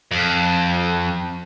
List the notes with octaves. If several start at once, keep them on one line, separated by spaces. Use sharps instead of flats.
F2